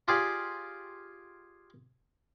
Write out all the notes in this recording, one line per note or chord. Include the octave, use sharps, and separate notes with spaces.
F4 G4 G#4 D5